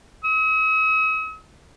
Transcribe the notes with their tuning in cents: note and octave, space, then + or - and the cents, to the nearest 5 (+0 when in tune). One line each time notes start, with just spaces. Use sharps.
D#6 +45